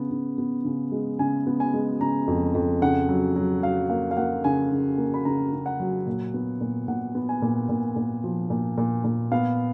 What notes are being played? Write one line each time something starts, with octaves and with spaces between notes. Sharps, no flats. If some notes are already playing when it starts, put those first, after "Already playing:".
Already playing: C#3 B3
C#3
B3
C#3
G#3
C#3 G#5
B3
G#5
G#3
C#3 A#5
F2
F2
C#3 F#5
F#3
F#3
F#3 F5
A#3 F5
F5
A#3 F#5
C#3 G#5
C#3
A#3
B5
C#3 A#5
C#3
F#5
F#3
A#2
B3
A#2
A#2 F#5
B3
G#5
A#2
A#2
A#2
F3
A#2
A#2
A#2
B3 F5